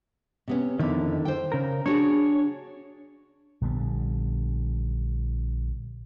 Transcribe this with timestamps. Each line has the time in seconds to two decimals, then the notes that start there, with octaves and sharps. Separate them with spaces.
0.48 C3 B3 C#4
0.79 F2 D3 D#3 E4
1.25 C5 G5
1.52 C#3 A#4
1.86 D4 F#4 G#4 C#5
3.61 A#1 D3 G3 B3